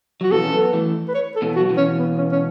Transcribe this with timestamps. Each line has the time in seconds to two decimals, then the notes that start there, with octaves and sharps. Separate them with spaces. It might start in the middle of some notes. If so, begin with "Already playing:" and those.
0.21 F#3 F#4
0.31 B2 E3 A4
0.44 C#4
0.52 F#3 B3
0.73 E3 A3
1.08 B4
1.14 C#5
1.36 A4
1.42 B2 E3
1.56 F#4
1.60 F#3
1.70 B2 E3
1.77 C#4
1.98 B3
2.18 C#4
2.31 C#4